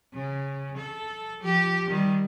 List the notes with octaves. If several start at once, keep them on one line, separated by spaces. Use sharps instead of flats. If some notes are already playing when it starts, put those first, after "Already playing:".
C#3
A4
F3 G4
D#3 G3